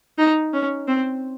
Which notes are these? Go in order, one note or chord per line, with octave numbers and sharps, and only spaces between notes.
D#4
C#4
C4